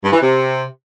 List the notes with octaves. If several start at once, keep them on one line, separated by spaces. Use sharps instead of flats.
G2
E3
C3